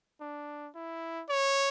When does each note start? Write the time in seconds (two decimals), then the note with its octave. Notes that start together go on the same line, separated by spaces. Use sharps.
0.21 D4
0.75 E4
1.29 C#5